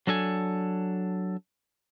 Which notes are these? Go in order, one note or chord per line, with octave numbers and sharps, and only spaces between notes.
F#3 D4 A4 G#5